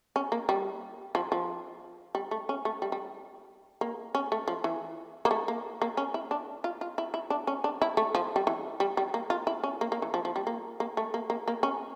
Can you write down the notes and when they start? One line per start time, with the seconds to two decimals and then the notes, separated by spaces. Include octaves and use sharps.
0.16 C#4
0.32 A#3
0.49 G3
1.15 F3
1.32 F3
2.15 G3
2.31 A3
2.49 C#4
2.65 A3
2.82 G3
2.92 G3
3.81 A#3
4.15 C#4
4.32 A3
4.48 F3
4.64 E3
5.25 A#3
5.31 A3
5.48 A#3
5.82 A#3
5.97 C#4
6.14 E4
6.31 D4
6.64 F4
6.81 F4
6.98 E4
7.14 E4
7.30 D4
7.47 C#4
7.64 D4
7.82 E4
7.97 A3
8.15 F3
8.36 G3
8.47 E3
8.80 G3
8.97 G3
9.14 A#3
9.30 F4
9.47 E4
9.64 C#4
9.81 A#3
9.92 A#3
10.02 E3
10.14 F3
10.25 F3
10.36 G3
10.47 A#3
10.80 A#3
10.97 A3
11.14 A#3
11.30 A#3
11.48 A#3
11.63 C#4